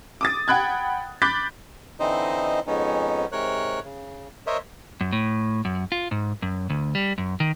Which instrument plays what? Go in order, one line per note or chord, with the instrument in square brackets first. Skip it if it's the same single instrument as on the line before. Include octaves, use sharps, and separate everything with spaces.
[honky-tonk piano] D6 D#6 A6
F#5 G5 B5 F#6 G#6
B5 D6 F#6 G6 A6 B6
[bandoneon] D3 E3 C4 D#4 C5 D#5
F2 G#2 B3 C#4 D#4
G#2 C3 A#4 C#5 F#6
C#3
A#4 C5 C#5 D#5 E5
[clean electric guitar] F#2
A2
F#2
F4
G#2
F#2
D2
G3
F#2
D#3